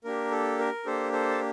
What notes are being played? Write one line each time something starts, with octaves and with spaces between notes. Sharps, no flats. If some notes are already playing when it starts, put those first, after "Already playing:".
A#3 D4 G4 A#4
A4
A#4
A#3 D4 G4 A4 C5
A4 C5
A5